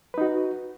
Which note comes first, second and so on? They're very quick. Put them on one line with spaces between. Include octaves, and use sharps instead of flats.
B4 D#4 F#4